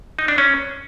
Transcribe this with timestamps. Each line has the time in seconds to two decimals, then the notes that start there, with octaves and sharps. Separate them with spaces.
0.19 D#4
0.28 D4
0.38 C#4